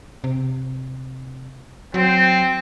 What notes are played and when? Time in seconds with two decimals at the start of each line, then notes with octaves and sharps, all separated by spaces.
0.24 C3
1.94 F#3 C4